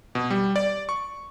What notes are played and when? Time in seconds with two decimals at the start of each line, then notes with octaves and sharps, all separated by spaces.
0.15 B2
0.31 G3
0.56 D5
0.89 C#6